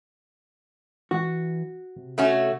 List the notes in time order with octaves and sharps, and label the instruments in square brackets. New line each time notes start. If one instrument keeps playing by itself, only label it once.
[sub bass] E3 [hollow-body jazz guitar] F#4
[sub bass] C3
[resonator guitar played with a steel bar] A3 C#4 F#4